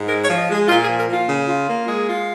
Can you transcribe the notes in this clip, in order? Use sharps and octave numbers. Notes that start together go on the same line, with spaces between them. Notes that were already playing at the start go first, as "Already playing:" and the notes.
Already playing: G#2
G#3 A#4
C#5
F3
D#5
G#3
G#4
A#2 F4
G#4
F3
A#4
A#2
F4
C#3
F4
A#3
G#3 G#4
F4